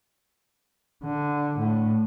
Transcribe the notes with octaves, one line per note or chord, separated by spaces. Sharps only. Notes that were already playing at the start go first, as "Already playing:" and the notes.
D3
A2